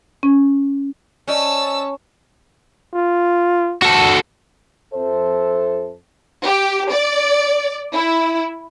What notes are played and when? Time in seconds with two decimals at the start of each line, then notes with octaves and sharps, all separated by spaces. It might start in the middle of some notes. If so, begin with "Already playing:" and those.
0.23 C#4
1.28 C#4 C5 D5 D#5 A5 E6
2.94 F4
3.82 F#4 A4
4.94 F2 A4 C5 E5
6.44 G4
6.91 D5
7.93 E4